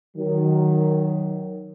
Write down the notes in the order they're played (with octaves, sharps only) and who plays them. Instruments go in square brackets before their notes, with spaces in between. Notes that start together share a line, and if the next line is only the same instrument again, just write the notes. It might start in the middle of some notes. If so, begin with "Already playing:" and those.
[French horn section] D#3 F#3